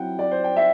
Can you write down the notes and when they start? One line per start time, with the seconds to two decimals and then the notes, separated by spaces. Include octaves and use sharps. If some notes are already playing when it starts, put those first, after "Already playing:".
Already playing: F#3 C4 E4 F#5 G5
0.19 D5
0.31 C5
0.44 G5
0.56 E5